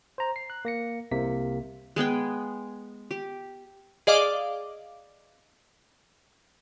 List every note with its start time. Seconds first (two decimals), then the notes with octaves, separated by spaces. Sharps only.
0.18 C5 A#5
0.36 C7
0.50 F#6
0.65 A#3 A#6 C#7
1.11 C2 C3 A#3 B6
1.96 G#3 B3 G#4 G5
3.11 G4
4.07 G#4 D5 D#5 F5 D6